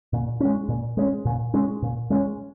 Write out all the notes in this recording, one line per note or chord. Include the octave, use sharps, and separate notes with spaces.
A#2
G#3 C#4
A#2
G#3 C#4
A#2
G#3 C#4
A#2
G#3 C#4